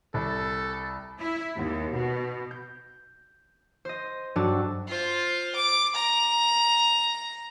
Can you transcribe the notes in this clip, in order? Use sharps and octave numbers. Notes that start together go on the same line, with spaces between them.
C2 A4
E4
D#2
B2
G6
C5 D#5
G2 F#3 D4 F#4 A4 D5
F4 C5
D6
A#5